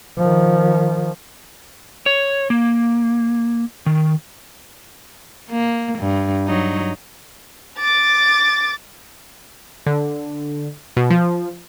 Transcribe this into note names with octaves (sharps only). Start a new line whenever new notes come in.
D#3 F3
C#5
A#3
D#3
A#3
G2
F#3 D#4
D6 A6
D3
B2
F3